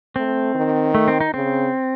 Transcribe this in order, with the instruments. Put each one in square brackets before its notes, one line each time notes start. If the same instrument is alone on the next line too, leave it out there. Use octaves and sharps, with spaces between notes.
[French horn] A3 [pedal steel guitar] C4
[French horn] D#3
[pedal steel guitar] A3
C4
D#4
[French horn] C#3 [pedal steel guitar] C4